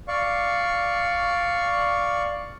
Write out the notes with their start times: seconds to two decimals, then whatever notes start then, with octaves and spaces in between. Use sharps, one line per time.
0.08 D5 F5 C#6